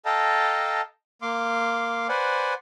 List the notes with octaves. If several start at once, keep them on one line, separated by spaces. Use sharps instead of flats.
A4 D#5 F5 G5 A5 A#5
A#3 F5 C6 D6
B4 C5 D5 F#5 G#5